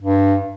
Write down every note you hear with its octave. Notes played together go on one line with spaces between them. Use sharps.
G2